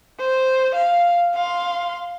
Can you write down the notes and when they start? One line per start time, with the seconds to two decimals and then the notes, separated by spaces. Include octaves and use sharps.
0.19 C5
0.75 F5
1.34 F5 C6